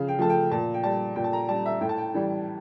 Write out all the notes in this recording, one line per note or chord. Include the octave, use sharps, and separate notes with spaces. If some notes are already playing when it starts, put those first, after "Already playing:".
Already playing: C#3 F3 F5
G5
F3 A3 A5
G5
A#2 A5
G5
G3 A5
A#2 G5
A5
A#5
G3 A5
E5
A2 G5
A5
G5
E3 G3